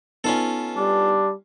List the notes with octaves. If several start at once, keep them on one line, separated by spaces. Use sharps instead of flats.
B3 C#4 D#4 F4 A4 B4
G3 D4